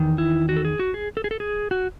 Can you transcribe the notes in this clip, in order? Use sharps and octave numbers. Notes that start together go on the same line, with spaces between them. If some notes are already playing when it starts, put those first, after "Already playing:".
Already playing: E2 D#3
E4
F#4
A4
G#4
F#4
G#4
A4
G#4
A4
G#4
F#4